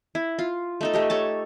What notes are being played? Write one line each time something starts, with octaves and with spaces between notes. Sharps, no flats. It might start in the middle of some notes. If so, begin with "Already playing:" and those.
E4
F4
A3 D#4 A4
A3 G4 D#5
A4 C#5 A5